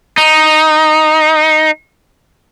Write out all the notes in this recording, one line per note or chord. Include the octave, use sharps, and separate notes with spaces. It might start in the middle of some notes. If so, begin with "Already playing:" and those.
D#4